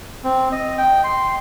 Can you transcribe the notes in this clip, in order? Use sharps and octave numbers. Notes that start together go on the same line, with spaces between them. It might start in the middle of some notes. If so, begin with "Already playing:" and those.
C4
D#5
G5
C6